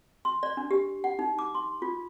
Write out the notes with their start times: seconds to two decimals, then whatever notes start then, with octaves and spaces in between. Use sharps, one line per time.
0.25 C6
0.43 D5
0.57 D4
0.71 G4
1.04 F#5
1.19 D#4
1.39 D6
1.55 C6
1.82 F4